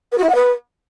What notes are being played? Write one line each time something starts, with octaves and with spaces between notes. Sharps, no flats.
B4
F#4
E4
F#5
B4